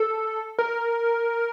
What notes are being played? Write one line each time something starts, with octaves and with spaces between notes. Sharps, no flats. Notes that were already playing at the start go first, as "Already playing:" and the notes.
Already playing: A4
A#4